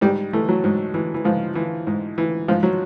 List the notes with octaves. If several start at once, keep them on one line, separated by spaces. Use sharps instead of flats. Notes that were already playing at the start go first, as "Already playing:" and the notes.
G#2 G3
E3 A3
F#3
G#2
E3
E3
G#2 F3
E3
G#2
E3
G#2 F3
F#3